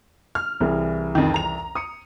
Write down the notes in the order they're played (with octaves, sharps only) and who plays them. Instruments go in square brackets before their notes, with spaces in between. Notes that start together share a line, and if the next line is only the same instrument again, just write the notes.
[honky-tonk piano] F6
[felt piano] C2 E3 G#4
[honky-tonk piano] F2 D#3
A#5 F7
[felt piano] D#6 C#7